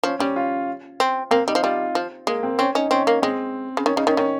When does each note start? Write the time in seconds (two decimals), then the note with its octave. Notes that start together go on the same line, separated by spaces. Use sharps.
0.03 F3 C#4
0.19 G3 C#4
0.36 F4
1.00 C4
1.31 A#3 C4
1.48 G3 D#4
1.55 F3
1.63 G3 F4
1.95 F3
2.27 G#3 A#3
2.43 C4
2.59 C4 C#4
2.75 C#4 D#4
2.91 C4 C#4
3.07 A#3
3.22 G#3 C4
3.77 C#3
3.86 D#3 C#4
3.96 C#3 D#4
4.07 D#3 C#4
4.17 D#3 C#4